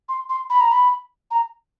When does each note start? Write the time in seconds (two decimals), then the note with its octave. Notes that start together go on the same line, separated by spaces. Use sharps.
0.09 C6
0.30 C6
0.50 B5
0.61 A#5
0.70 B5
1.31 A#5